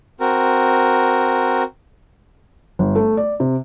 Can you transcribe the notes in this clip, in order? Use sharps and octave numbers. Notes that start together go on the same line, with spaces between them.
C4 F#4 A#4
G1
A3
D5
C3